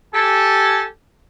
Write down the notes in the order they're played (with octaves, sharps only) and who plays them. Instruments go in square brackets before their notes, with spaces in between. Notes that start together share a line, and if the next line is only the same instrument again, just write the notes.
[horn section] G4 G#5 A5 [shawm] A4